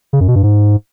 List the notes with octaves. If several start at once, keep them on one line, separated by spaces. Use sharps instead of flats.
C#3
F#2
B2
G2
G#2